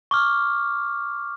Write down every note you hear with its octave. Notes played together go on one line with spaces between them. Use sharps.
C#6 D6 F6